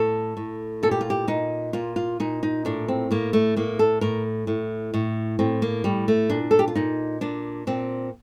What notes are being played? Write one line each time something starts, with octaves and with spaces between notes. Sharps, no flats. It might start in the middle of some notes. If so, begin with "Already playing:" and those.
Already playing: A2 A4
A2
A#2 A4
G4
F4
G4
A#2 D#4
A#2 F4
F4
A#2 D#4
D#4
A2 D4
C4
A2 A#3
A3
A2 A#3
A4
A2 A#4
A2
A2
A2 C4
A#3
A2 G3
A3
A#2 D4
A4
G4
F4
A#2 D#4
A#2 D4
A#2 C4